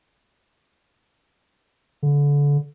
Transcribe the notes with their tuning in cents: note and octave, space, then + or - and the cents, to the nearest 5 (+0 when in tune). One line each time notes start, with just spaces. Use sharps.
D3 -30